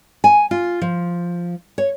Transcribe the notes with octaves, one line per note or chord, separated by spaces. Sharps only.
G#5
F4
F3
C#5